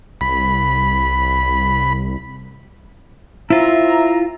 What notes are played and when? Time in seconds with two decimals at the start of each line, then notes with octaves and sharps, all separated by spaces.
0.21 C2 B5
3.50 C4 E4 F4 E5 A#5